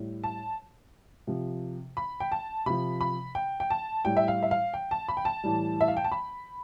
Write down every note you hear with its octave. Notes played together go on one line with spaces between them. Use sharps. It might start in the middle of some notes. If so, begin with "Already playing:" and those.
Already playing: A2 G3
A5
C3 F3
B5
G5
A5
C3 F3 B5
B5
G5
G5
A5
A2 G3 G5
E5
F5
E5
F5
G5
A5
B5
G5
A5
A2 E3 G3
E5
F5
G5
A5
B5